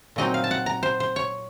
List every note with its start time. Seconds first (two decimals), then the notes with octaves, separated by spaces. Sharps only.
0.16 A#2 F#3 C4 D#4 D#5
0.34 F5
0.44 A5
0.51 F#5
0.66 A#5
0.83 C5
1.00 C5
1.16 C#5